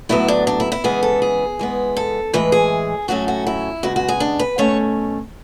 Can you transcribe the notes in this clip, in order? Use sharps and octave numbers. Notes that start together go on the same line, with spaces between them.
A2 F#3 B3 E4
D4
D4
E4
E4
C#3 E3 G#3 B3 G#4
A4
G#4
E3 G#3 B3
A4
A2 E3 G#3 B4
G#4
A2 F#3 A3 C#4 F#4
F#4
E4
C#3 G#3 B3 F#4
F#4
G#4
D4
B4
B2 A3 C#4 C#5